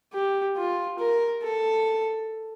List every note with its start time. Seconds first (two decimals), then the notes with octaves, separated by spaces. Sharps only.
0.13 G4
0.56 F4
0.99 A#4
1.43 A4